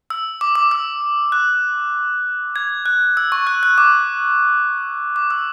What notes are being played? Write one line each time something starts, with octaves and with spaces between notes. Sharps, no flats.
E6
D6
D6
E6
F#6
G#6
F#6
E6
C#6
F#6
F#6
D6
D6
E6